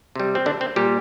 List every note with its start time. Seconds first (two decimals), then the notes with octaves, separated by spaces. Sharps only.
0.16 C3 G3
0.35 C4
0.46 D3 D4
0.61 C4
0.76 A#2 G3 G4